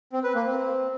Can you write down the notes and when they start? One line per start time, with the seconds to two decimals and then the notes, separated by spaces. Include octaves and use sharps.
0.13 C4
0.24 B4
0.35 A#3
0.46 C4